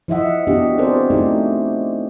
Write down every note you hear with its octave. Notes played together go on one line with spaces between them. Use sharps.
F3 E4 D#5 E5 F#5
B3 D4 F#4 G4 D#5
C4 F#4 G#4 A#4 C5 D5
A3 D#4 E4 F#4 G4